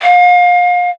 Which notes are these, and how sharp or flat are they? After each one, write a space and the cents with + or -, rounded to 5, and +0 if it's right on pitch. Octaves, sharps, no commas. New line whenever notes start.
F5 +35